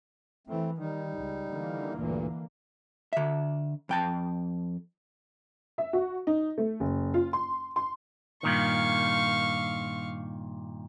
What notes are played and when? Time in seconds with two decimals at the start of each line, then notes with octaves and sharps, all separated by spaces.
0.47 E3 A3 C4
0.78 D#3 G3 D#4
1.17 C#2
1.50 D3 E3 A#3
1.95 D2 G2 A#2
3.13 D3 E5
3.89 F2 G5 A5
5.78 E5
5.93 F#4
6.27 D#4
6.58 A3
6.80 F#1
7.14 F4
7.33 C6
7.76 C6
8.43 G2 A#2 D#3 F5 C#6